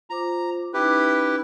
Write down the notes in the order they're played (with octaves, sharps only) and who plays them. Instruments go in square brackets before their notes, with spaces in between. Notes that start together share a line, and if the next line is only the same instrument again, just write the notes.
[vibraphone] F4 C5 D6 [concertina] A#5
[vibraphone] C#4 D#4 [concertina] E4 G4 B4